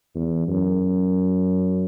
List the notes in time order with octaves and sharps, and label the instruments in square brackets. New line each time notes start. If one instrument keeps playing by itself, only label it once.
[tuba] E2
F#2